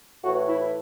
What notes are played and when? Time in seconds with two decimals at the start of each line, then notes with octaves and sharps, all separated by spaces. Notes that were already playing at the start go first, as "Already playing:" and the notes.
0.23 A2 E3 F#4
0.46 E4